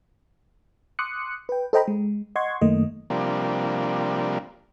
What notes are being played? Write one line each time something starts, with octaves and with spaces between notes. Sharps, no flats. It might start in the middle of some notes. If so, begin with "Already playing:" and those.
C6 D6 D#6 F#6 C#7
B4 G5
A4 C5 D#5 G5 A#5 B5
G#3
D#5 F#5 C6 C#6 G#6
F#2 D#3 A3 A#3 D#5
C3 F3 G3 A#3 D4